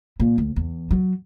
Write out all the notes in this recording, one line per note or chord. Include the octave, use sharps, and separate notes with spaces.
A#2
D2
E2
F#3